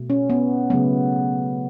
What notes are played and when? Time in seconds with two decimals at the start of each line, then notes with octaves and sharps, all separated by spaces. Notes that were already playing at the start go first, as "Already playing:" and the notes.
Already playing: B2 A3
0.10 C#4
0.30 B3
0.70 C#3 F#3 A3 B3